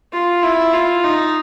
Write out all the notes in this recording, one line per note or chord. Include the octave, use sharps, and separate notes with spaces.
F4
E4
F4
D#4